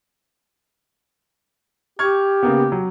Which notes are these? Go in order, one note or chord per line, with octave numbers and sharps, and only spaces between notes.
G4 C#6 F6 G#6
C#3 A#3 B3
F#3